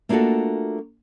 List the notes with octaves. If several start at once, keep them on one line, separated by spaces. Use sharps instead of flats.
A3 A#3 D4 F4 F#4 A4